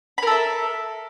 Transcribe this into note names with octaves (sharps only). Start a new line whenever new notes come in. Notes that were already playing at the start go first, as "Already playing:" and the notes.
A4 A#4 E5 B5